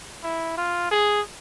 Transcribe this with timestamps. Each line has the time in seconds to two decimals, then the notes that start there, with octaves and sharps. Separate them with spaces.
0.23 E4
0.57 F4
0.91 G#4